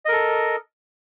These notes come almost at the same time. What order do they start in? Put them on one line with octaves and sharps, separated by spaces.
D#5 A#4 A4